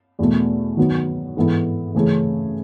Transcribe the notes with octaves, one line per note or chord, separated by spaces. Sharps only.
E2 B2 A3
D#3 F#3 B3
G#2 E3 B3 E4 A4
C#3 E3 A3 C#4 G#4